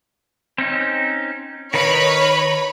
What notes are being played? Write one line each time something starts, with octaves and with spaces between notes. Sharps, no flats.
C4 C#4 D#4
D#3 D#4 A#4 B4 C#5 B5